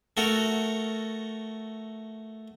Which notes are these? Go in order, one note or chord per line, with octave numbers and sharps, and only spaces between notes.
A3 F#4 A4 A#4